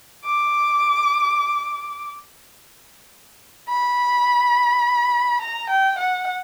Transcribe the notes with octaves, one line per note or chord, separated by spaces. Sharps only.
D6
B5
A#5
G5
F#5